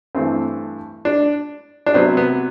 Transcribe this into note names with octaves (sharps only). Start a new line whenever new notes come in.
G2 E3 A3 C4
D4
D4
C3 F#3 B3 C4
B3